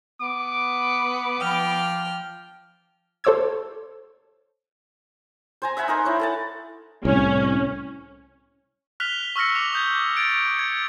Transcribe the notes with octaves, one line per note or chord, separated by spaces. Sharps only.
B3 D6
F3 G5 F6
A4 C5 C#5 D6 E6 G#6
C5 G#5 A#5
E5 F#5 G#5 B5
D#4 A#4 C5
E4 C#5
A4 F#5 A5
C2 A2 C#4
F6 F#6 B6 F7 G7
C#6 E6 F6 A#6 C#7
D6 F7
D#6 G6 G#6
G#6 A6 D7 F7
G#6 C#7